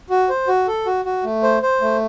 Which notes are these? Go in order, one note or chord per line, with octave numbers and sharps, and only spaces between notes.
F#4
C5
F#4
A4
F#4
F#4
A3
C5
C5
A3